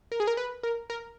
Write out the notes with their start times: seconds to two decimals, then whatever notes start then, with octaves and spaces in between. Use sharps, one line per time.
0.12 A#4
0.20 G#4
0.27 A#4
0.37 B4
0.63 A#4
0.90 A#4